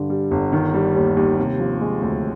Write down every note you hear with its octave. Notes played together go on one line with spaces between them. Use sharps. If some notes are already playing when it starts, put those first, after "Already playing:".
Already playing: G2 D3
G3
G1
D#3
G3
D#2
D#2
C3
F3
G#3
D2